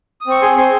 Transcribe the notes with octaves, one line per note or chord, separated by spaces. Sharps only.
D#6
C4 C#6
G#4 G#5 C6
C4 G#5 C6